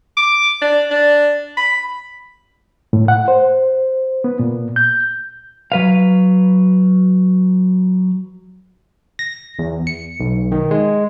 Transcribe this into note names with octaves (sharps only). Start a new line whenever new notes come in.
D6
D4
D4
B5
A2
F#5
C5
B3
A#2
G6
F#3 B4 F5
A#6
E2
C#7
B1
D#3
G#3